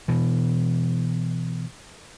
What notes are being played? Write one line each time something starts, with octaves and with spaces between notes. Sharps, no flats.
B2 E3